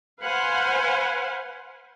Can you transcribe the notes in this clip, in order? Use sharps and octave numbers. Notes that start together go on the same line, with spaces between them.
B4 C5 F5 F#5 G#5